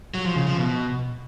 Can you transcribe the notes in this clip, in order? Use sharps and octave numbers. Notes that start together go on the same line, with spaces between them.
F#3
F3
C#3
F3
B2